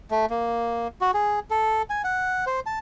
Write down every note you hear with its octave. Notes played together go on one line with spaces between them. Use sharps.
A3
A#3
F#4
G#4
A4
G#5
F#5
C5
A5